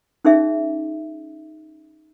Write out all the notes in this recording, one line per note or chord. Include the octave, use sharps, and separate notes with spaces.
C#4 D#4 G#4 E5